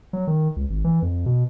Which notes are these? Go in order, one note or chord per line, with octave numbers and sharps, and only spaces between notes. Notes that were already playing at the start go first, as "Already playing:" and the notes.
F#3
D#3
C#2
G#1
E3
F2
B2